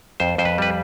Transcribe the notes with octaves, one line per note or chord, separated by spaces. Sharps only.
F2 C5
F2 C5
B4
G3 B4